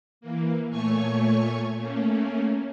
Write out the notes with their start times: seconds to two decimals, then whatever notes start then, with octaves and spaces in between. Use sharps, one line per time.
0.21 E3 A#3
0.70 A#2 A3 C#5 G#5 C#6 G#6
1.76 A3 A#3 C#4